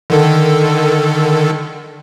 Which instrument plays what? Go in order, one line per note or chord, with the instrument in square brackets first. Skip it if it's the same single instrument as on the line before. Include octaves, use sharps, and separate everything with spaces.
[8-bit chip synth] D3 D#3 A4